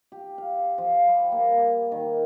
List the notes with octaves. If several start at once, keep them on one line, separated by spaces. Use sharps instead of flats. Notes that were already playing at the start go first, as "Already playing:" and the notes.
G4
F5
F3
G3
A#3
D#3